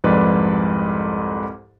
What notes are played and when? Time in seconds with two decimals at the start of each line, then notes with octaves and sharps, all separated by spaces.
0.04 C2 F2 G#2 B4 D5 D#5